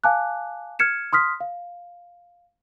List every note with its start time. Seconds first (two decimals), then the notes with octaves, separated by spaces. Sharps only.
0.04 F5 G#5 A5 D6 F#6
0.79 F6 G#6 C#7 E7
1.13 C6 D#6 F6 B6
1.41 F5